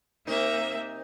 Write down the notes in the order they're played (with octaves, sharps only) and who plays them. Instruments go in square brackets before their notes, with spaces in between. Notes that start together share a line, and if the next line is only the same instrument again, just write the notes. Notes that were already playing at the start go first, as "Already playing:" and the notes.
[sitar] C3 D#4 A#4 [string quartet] A#3 E5